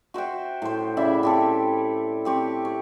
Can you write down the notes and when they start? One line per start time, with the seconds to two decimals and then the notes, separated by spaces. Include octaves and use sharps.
0.14 F#4 C5 E5 G5
0.62 A2 C5
0.97 C#3 E4 D5 E5
1.23 C4 G4 A4
2.25 C4 G4 C#5
2.65 C#5